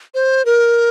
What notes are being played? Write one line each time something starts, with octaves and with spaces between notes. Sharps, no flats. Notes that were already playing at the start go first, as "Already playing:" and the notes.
C5
A#4